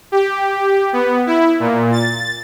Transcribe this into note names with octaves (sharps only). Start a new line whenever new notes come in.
G4
B3
E4
A#2
A6